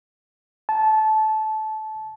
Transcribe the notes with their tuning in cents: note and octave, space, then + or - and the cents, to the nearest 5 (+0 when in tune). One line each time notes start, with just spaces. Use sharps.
A5 -20